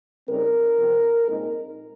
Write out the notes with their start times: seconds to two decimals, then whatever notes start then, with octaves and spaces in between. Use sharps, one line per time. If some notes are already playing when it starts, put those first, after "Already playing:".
0.27 C#3 G3 C4 D#4 A#4
0.77 C3 F3 C4
1.28 A#2 G#3 C4 D#4